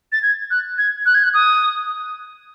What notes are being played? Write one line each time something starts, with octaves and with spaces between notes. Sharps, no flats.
A6
G#6
F#6
G#6
F#6
G#6
F#6
D#6